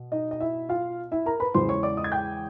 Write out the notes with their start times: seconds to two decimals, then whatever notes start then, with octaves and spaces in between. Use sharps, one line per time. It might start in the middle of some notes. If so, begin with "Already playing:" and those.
Already playing: B2
0.12 D#4 D#5
0.31 D#5
0.40 E4 E5
0.69 F4 F5
1.12 E4 E5
1.26 A#4 A#5
1.40 B4 B5
1.54 E2 C#3 E3 G#3 C5 C6
1.69 C#5 C#6
1.83 D5 D6
1.97 D#5 D#6
2.04 G#6
2.12 G5 G6